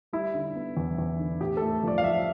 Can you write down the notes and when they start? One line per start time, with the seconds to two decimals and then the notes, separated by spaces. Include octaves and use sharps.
0.13 G3 E4
0.34 D3
0.55 B3
0.77 E2
0.98 E2
1.19 D3
1.41 A2 G4
1.57 A3 A4
1.83 F3 D5
1.98 F5
2.03 F3 E5